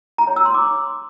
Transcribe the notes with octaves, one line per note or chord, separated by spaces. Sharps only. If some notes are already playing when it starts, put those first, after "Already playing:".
A#5
C#5
E6
C6
D6